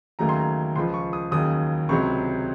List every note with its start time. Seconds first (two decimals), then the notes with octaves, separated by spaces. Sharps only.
0.19 D#2 C#3 F#3 A3 A#5
0.29 C6
0.39 A#5
0.76 C#2 C#3 F3 C6
0.94 C#6
1.13 D#6
1.31 D#2 C#3 F#3 D#6
1.89 C#2 C3 F#3 C#6